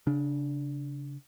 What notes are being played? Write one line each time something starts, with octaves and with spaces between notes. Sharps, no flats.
C#3 D4